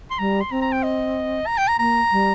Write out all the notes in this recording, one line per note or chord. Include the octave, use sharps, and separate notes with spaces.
C6
G3 A#5
C6
C4 A#5
A#5
G5
D#5
A#5
G5
A#5
A#3 A#5
G3